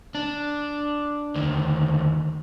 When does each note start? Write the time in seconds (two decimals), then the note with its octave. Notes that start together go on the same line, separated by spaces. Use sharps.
0.15 D4
1.35 D2 D#3